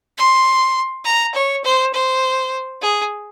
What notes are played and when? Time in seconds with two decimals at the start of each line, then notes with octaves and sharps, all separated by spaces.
0.18 C6
1.05 A#5
1.35 C#5
1.64 C5
1.94 C5
2.82 G#4